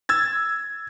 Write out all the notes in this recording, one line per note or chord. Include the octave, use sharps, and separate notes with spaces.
E6 G#6 A6